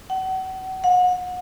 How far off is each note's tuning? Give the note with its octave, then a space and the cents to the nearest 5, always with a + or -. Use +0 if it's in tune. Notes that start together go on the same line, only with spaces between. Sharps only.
F#5 +35
F#5 -35